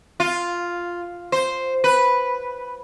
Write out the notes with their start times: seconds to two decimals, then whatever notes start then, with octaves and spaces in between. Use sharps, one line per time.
0.20 F4
1.32 C5
1.84 B4